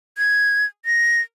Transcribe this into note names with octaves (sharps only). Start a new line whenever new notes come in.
G#6
A#6